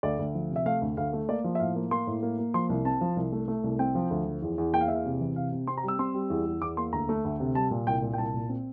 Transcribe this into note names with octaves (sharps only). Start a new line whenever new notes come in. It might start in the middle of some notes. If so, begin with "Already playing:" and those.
D2 D5
D2
F3
C3
E5
A3 F5
D2
D2 F5
A3
A#3 D5
F3
E5
A2 F5
A#3
A#3 C6
A2
A#3
A#3
F3 C6
C2
C4 A5
F3
C2
A3
A3
C2
C4 G5
F3
D2
F3
E2
E2
A#3 G5
F5
E2 E5
F5
C3
E3
C3 F5
C3
C4 C6
A#5
G3
E6
C4 C6
G3
E2
E2
E2 D6
A#3 C6
D2 A#5
A3
D2
C3
G3 A5
A#2
C2 G5
A#2
G5
C2 A5
A#2
C4